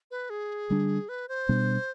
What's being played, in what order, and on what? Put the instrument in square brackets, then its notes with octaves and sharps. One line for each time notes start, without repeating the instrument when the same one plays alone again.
[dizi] B4
G#4
[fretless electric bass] D3 G3 D4
[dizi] B4
C5
[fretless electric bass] B2 G3 B3 D4